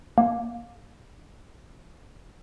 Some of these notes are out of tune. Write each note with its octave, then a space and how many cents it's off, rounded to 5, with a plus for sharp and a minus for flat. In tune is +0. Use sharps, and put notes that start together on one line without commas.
A#3 +25